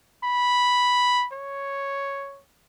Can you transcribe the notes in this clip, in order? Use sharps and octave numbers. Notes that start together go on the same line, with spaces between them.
B5
C#5